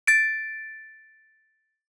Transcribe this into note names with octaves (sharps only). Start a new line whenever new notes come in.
A6 D7